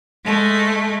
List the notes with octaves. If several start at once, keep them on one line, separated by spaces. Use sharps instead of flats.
G#3 A3